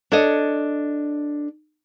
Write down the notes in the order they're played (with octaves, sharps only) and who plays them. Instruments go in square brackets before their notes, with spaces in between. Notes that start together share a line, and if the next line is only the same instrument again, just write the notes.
[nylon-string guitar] D4 A4 C#5 D#5